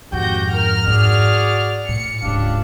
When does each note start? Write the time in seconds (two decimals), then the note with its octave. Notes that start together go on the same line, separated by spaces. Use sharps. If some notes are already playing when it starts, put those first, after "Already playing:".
0.12 G#1 F2 G#2 F#4 G4 G5 G6 A#6
0.54 A#4 F6
0.87 G#2 B3 F#4 G#4 D5
1.89 A2 C#7
2.23 D1 C#2 G#2 D4 G4 F5